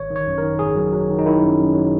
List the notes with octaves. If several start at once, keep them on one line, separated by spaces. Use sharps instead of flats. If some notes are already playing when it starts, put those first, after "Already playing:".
Already playing: G#1 C#5
D#3
C#5
F#2
D#3 A#4
G#1 G#4
F#3
F#3
D#3
D#4
D#3 E4
F#2
F#2
F#3